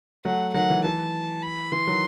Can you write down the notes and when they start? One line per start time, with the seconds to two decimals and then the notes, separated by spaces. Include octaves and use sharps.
0.25 F#3 A3 F#5
0.54 D#3 F#3 F#5
0.70 E3
0.84 E3 A5
1.42 B5
1.72 E3 C6
1.87 D#3 F#3